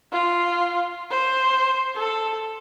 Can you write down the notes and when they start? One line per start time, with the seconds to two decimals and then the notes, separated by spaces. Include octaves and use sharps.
0.12 F4
1.10 C5
1.95 A4